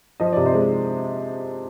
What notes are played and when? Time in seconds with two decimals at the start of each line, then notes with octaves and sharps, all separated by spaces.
0.20 F3 D#5
0.33 C3 D5
0.45 C5 D#5
0.55 G#3